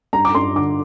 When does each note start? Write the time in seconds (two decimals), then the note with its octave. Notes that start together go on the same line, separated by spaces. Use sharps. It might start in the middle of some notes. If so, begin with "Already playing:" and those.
0.13 G2 A#5
0.25 D6
0.35 G2 C6
0.56 D3 D6